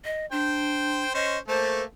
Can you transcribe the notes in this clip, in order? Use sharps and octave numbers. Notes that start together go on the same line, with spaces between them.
D#5
D4 C5 G5
C#4 C5 D#5
A3 A#3 A4 C5